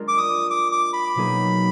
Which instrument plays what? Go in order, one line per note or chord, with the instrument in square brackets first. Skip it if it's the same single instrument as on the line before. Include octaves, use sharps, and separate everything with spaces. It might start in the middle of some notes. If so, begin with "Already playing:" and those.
Already playing: [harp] G#3 D4 F4 A#4
[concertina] D6
D#6
D6
D6
B5
[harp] B2 F#3 A#3 D#4 G#4